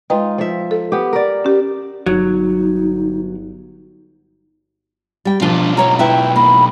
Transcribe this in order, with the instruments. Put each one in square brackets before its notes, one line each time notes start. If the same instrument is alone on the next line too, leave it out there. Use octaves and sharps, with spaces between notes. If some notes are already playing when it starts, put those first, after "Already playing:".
[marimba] G#3 B4 G5 [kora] D#4 F4
[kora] F3 E5
[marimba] A4
[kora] B3 G4
A#4 D5
[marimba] C#4 G4
[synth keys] G1 [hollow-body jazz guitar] F#3 [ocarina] D#4
[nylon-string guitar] G3 G5
[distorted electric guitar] B1 F4 [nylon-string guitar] F3 D4 A#4
[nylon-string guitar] A#4 C#5 G5 [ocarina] A#5
[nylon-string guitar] E4 B4 E5 [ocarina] G5
[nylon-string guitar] A#3 [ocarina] B5